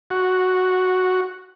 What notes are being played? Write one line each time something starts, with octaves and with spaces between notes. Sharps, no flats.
F#4